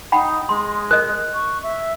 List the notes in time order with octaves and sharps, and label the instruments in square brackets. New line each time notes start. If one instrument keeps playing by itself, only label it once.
[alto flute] D#4 [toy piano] F#5 G5 B5
[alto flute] G#3 [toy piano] C6
[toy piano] A#4 D#5 [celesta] F#6
[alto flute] C#6
E5